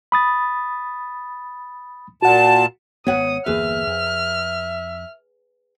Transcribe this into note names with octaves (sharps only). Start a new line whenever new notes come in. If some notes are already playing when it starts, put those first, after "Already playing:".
B5 D#6 A6
A#2 F#4 F#5 A5
G#1 B3 C#5 F#5 D#6
G1 E2 A#3 G#4 B4 E5 F6
F2